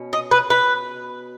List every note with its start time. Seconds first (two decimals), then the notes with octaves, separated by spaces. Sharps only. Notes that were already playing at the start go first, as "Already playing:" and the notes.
Already playing: B2 C#4
0.13 D#5
0.31 B4
0.50 B4